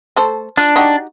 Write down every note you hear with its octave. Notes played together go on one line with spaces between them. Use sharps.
A3 A4 C5
D4 F4
D#4 F#4 G4